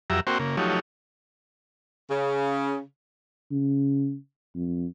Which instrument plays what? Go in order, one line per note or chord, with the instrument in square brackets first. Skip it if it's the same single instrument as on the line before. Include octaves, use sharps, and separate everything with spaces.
[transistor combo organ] F2 F#3 G4 E5 A#5
A#3 C4 F#4 C5 G5 C#6
C#3 A#3
F3 F#3 A3 D#4 G4 C#5
[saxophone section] C#3
[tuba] C#3
F2